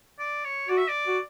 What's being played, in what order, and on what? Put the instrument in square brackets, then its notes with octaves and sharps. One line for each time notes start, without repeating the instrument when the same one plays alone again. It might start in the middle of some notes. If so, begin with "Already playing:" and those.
[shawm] D5
C#5
[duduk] F#4 [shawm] D5
[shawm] E5
D5
[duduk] F#4